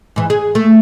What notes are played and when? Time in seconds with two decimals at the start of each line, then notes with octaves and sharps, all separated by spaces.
0.16 G#2 E3
0.30 G#4
0.55 A3